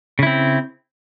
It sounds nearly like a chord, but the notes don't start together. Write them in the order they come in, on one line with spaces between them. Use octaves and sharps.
C#3 E4 C4